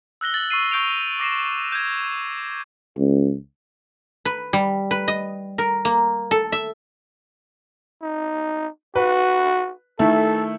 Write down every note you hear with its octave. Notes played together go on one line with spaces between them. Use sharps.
E6 F#6 A#6 G7
A6 F#7
C#6 E6 C7 D#7
C#6 G6 D7 F7
D6 A#6 C7 E7
G6 G#6
C#2
B4
G3
B4
D#5
A#4
A#3
A4
E5
D#4
F#4 B4
D#3 A3 E4 A4